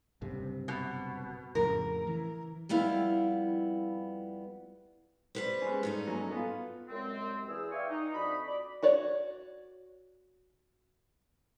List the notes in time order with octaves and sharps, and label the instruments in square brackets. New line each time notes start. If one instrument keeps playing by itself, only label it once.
[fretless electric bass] F#1 G2 C3
[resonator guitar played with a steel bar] B2
[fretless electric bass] F2 A2 C#3 [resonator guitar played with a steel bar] A#4
[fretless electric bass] E3
[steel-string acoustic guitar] F2 G3 B3 E4 F5
G3 B4 C5
[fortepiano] G#3 C#4
[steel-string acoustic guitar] G2 D#4 A4
[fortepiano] F#3 C#4
B3 F4
[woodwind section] C2 F#2 G#3 C4
E2 G#4 E6
D5 E5 F5 G5 G#5 C#6
D#4
F2 D4 F#4 D#5 B5
D5 B5 D6
[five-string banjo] F#4 C#5 D5